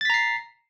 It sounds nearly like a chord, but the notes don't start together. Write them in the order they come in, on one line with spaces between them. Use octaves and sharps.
A6 B6 A#5 C7